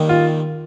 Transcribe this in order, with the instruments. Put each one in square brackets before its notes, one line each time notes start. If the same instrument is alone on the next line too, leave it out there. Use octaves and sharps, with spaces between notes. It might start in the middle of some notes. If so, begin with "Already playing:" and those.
Already playing: [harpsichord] D#2 D#3 G3
[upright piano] F4